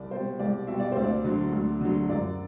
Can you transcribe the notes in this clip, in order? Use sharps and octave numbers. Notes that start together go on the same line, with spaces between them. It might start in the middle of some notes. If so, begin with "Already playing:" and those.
Already playing: C2 D5
B2 G3 C5
C2 D5
B2 G3 E5
D5
D2 C5
D5
D3 F#3
D2
D3 F#3
F#2 D5